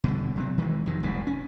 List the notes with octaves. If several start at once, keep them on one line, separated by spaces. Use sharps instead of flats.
B2 D3 G3
C3 F#3 C4
D#3 E3 G3 G#3
F2 C3 D#3
F1 C2 G#2 B2
C#4